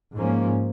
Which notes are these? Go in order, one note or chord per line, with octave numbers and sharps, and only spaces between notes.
G#2 F3 A#3 C#4